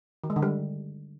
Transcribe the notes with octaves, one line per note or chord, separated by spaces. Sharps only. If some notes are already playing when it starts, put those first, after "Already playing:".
D#3
G#3
D3
G3